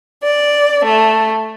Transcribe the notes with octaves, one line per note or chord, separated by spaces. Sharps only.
D5
A3